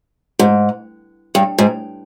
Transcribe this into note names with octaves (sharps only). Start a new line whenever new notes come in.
G#2
G2
G#2